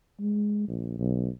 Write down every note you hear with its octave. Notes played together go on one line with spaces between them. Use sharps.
G#3
A#1
B1